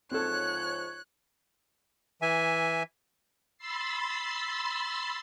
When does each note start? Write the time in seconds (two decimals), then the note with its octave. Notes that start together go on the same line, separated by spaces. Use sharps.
0.12 G#2 F3 C4 A4 C#5 F#6
2.22 E3 E5 G#5
3.58 B5 C6 E6 A6 C7